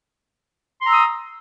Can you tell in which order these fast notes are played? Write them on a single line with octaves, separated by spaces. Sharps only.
C6 A#5 E6 D#6